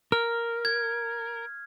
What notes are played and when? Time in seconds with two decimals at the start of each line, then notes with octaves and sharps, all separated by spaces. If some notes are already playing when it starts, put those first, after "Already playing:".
0.12 A#4 F6
0.65 G#6